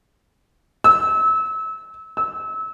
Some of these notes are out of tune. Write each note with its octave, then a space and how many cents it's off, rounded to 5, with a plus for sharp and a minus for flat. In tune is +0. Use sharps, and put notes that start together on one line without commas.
E6 -25
E6 -25